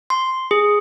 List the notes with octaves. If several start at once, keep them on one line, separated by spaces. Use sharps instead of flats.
C6
G#4